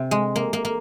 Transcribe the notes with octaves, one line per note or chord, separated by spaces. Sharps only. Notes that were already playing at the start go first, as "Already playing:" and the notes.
Already playing: C3
G#3
A#3
A#3
A#3